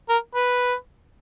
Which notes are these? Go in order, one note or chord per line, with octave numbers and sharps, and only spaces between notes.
A#4
B4